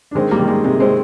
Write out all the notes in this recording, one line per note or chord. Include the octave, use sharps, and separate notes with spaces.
D4
D#3 G#3 C4
G3 A#3
D#3
G#3
C3 G#3
G#3 C4